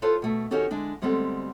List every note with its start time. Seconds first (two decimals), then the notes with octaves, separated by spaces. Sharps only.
0.02 E4 F4 A4 B4 C5
0.22 B2 A3
0.51 D#3 C#4 D#4 F#4 G4 A4
0.70 D3 G#3 D4 E4
1.02 D2 G3 G#3 B3 C4 A4